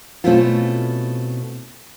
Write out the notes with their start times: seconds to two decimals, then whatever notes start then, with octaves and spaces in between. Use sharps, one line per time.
0.24 B2 A3 C4 C#4 E4 F4